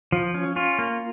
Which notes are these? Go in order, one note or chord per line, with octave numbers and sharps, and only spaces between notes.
F3
C#4
C#4 F4
A#3